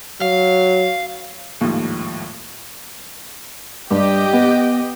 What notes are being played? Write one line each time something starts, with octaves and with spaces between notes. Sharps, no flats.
F#3 F5
G#1 D#2 A2 F3
G2 G4 D#5 G5
B3